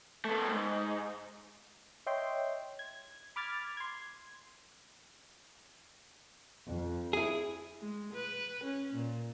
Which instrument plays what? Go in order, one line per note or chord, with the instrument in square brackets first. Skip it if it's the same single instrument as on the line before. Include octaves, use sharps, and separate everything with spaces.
[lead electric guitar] A3 B3
G#2
[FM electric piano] C#5 D#5 E5 G5 C6
G#6
B5 D6 F6 G#6 A6
C6 G#6
[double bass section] F2
[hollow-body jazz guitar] E4 G#4
[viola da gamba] G#3
B4
C#4
A#2